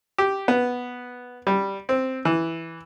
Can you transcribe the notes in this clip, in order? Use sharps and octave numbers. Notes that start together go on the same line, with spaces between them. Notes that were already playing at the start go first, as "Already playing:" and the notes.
G4
B3
G3
C4
E3